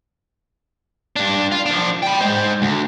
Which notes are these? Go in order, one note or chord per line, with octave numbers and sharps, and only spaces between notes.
G2 D4
F4
F3 D4
G5 B5
G#3 C5
D2